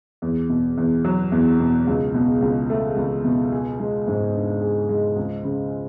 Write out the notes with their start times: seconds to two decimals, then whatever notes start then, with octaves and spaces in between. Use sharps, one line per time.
0.22 E2
0.49 B2
0.77 E2
1.05 F#3
1.32 E2
1.59 B2
1.87 C#2
2.14 B2
2.42 C#2
2.70 A3
2.97 C#2
3.25 B2
3.52 G#4
3.80 G#3
4.08 G#2
4.34 D4
4.62 G#4
4.89 G#3
5.16 C#2
5.44 C#3